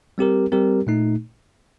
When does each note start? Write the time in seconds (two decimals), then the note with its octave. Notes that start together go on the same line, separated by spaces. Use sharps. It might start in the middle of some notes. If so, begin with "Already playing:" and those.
0.18 G3 C4 G4 A#4
0.52 G3 C4 G4 A#4
0.87 A#2 A3 D#4